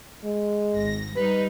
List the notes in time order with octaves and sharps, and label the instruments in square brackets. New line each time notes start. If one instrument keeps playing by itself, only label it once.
[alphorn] G#3
[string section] G#1 A#6
[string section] G3 D#4 [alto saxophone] B4